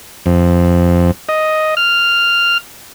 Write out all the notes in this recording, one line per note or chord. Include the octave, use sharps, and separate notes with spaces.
F2
D#5
F6